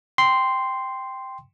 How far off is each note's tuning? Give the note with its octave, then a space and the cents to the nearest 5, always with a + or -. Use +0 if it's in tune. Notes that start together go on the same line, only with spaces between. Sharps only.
G5 +0 C6 -5